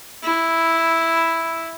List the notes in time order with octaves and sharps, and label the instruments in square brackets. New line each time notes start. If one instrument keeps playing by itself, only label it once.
[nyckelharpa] E4